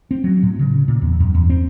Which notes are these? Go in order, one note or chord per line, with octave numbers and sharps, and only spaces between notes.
C4
F#3
A2
C#3
A#2
E2
F#2
E2
C4